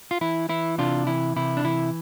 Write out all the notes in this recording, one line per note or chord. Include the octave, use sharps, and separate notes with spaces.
F4
E3 E4
E3 E4
C3 D4 F4
E3 E4
C3 E4
D4
E3 E4